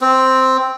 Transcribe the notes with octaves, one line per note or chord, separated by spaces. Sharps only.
C4